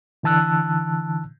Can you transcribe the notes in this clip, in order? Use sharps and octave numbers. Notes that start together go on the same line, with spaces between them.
D3 E3 A5 E6 F#6